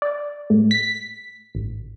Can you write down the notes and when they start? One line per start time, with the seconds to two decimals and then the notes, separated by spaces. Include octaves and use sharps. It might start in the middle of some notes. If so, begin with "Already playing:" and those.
0.02 D5
0.50 A2
0.71 B6
1.55 A1